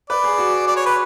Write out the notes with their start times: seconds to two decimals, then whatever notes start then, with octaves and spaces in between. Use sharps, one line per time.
0.10 B4 D5
0.24 G#4
0.38 F#4
0.67 D5
0.76 C#5
0.86 B4